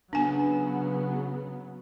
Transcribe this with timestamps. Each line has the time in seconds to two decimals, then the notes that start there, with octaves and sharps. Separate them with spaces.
0.13 C#3 F#3 B3 D4 G#5